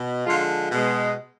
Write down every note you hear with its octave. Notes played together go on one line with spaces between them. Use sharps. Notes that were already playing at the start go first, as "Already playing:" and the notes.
Already playing: B2
D3 F3 G#3 F4
B2 G#3